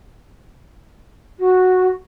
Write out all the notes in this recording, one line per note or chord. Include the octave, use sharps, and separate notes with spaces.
F#4